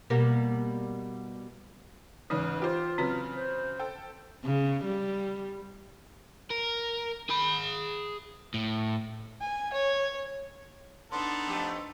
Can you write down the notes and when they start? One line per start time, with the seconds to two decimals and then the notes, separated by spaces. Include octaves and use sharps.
0.10 B2 G3 A#3
2.30 G#2 C#3 E3 B4
2.62 F4 G4 C5
2.98 C#3 F#3 C4 B4
3.35 C5
3.79 A4 G5
4.45 C#3
4.85 G3
6.50 A#4
7.29 G#4 B5
8.54 A2
9.41 G#5
9.73 C#5
11.12 B3 D4 D#4 A4 C6
11.47 F2 A3 G4